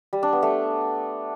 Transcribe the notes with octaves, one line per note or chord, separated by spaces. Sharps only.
G3
D4
B3
A3